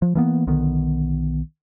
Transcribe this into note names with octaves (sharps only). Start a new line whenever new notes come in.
F3
E3 A#3 B3
B1 D3 D#3 B3